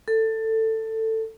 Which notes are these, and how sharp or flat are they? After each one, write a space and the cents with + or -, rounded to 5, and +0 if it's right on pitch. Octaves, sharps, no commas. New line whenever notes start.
A4 +15